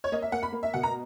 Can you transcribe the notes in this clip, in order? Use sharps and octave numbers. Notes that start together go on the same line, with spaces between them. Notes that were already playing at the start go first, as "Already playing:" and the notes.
C#5
A#3 D#5
E5
A#3 F#5
B5
A#3
E5
B2 F#5
A#5